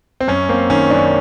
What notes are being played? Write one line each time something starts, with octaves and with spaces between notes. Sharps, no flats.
C4
F#2 C#4
A#3 C4
D#3 C#4
F#2 D4